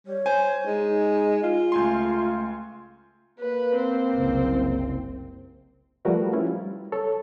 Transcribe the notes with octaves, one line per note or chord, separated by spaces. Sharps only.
G3 C#5
C5 G#5
G#3 D#4
F4
C#2 A3 G#5 C6
A#3 B4
C4
F#1 C2
F3 G3 A3 F#4 A#4 B4
C#4 E4 F4
G3
A4 C#5